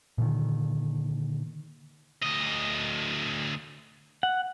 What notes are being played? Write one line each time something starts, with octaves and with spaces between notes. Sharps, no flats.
A#2 D3 D#3
D2 D#5
F#5